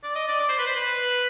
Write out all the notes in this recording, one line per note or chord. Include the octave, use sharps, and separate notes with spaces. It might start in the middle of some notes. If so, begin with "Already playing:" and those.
D5
D#5
D5
D5
C5
B4
C5
B4